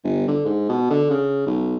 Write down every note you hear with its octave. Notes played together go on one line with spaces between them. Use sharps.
G1
D3
G#2
B2
D3
C#3
B1